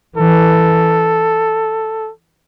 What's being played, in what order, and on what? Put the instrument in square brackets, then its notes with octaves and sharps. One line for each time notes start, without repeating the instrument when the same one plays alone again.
[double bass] E3 [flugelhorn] A4